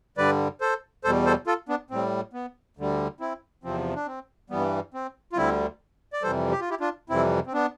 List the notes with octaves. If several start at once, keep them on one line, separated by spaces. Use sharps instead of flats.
G2 D3 G3 B4 D5
A4 C5
E2 B2 G3 A4 C5
A4 C5
F4 A4
B3 D4
A2 G3 C4
B3
D2 D3 G3
C4 E4
E2 C3 F3 C4
D4
C4
G2 E3 G3 B3
C4
F4
D2 D3 G3 C4 E4
D5
F2 C3 E3 G3 A4 C5
G4
F4
E4 G4
D4 F4
F2 C3 E3 G3 C4 E4
C4
B3 D4